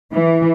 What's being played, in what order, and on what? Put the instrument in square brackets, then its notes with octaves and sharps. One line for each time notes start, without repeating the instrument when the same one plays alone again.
[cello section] E3